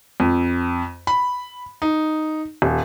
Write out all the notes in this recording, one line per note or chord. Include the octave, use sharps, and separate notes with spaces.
F2
B5
D#4
D#1